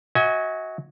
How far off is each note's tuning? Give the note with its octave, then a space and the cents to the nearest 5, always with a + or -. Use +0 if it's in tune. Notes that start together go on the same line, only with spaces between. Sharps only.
F#4 +0 D#5 +45 G#5 +0